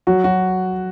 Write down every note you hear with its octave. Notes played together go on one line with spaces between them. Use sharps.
F#3 F#4
F#3 F#4